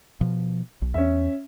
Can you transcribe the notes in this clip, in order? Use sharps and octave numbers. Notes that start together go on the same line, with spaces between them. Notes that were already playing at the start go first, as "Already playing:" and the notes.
B2 F3
B1
E2 C#4 E5